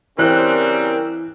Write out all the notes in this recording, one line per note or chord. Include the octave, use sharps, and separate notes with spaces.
C#3 E3 G3 C4 A#4 F#6